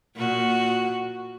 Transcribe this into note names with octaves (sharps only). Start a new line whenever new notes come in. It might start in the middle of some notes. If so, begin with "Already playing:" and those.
A#2 F#4